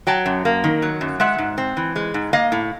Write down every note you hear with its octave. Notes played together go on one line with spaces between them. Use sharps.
F#3 G5 A5
F#2
A#3
D#3
F#3
F#2
G#3 E5 F#5
G#2
C4
E3
G#3
G#2
A#3 D#5 F5
A2